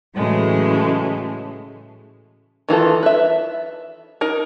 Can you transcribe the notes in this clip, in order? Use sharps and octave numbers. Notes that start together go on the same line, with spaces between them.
A2 C#3 E3 F#3 G#3 A3
D#3 E3 F4 A4
B4 E5
D#4 A#4